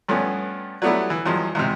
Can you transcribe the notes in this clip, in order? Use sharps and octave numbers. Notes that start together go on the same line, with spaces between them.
G2 F3 A3 B3 C#4
F#3 G3 A3 B3 D4 E4
E3
E2 G2 F3 F#3 G#3
E2 G#2 C3